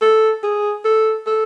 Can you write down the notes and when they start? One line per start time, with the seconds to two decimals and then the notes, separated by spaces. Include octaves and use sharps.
0.02 A4
0.44 G#4
0.85 A4
1.26 A4